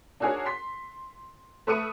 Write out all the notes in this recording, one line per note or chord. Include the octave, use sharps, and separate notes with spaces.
D4 D#4 F#4 G#4 A#4 C#5
C6 B6
A3 B4 C#6 D#6 C#7 D#7